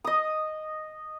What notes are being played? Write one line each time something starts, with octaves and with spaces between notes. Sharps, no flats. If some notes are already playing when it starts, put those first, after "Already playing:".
D#5 D#6